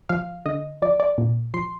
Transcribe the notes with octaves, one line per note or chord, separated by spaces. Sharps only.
F3 F5
D3 D#5
F3 D5
D5
A#2
F3 C6